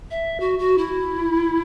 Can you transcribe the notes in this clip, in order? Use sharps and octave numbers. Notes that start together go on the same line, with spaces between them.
E5
F#4
F#4
E4